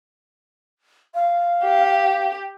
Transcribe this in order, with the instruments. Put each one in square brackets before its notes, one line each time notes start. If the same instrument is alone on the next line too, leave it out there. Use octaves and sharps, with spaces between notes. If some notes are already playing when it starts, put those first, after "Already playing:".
[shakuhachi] F5
[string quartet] G4